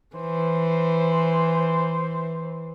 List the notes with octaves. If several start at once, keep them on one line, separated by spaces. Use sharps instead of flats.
E3 C5